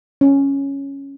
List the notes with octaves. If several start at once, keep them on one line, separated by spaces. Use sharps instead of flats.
C#4